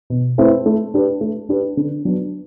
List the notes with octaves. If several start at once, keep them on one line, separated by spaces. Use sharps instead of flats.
B2
A3 C4 E4 B4
A3
D4 G4 B4
A3
D4 G4 B4
D3
F#3 B3 D4